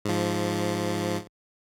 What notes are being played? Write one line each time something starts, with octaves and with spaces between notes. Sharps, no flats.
G#2 F3